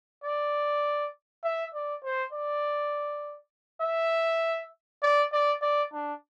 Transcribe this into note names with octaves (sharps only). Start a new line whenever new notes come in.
D5
E5
D5
C5
D5
E5
D5
D5
D5
D4